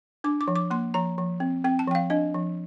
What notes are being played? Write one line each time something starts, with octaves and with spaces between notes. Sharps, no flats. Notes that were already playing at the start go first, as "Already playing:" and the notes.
D4 D6
D6
F3
D6
A#3 C6
F3 A#5
F3
C4
C4 G5
A5
F3 G5
F5
D4 D#5
F3